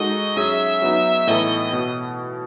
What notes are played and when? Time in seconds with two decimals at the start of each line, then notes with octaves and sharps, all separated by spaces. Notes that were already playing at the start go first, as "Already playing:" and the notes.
Already playing: G#3 D#4 F#4 A4 D#5
0.36 F#3 C#4 G#4 E5
0.82 F#3 B3 D#4
1.27 A2 E3 B3 E4 A4 D#5
1.73 B2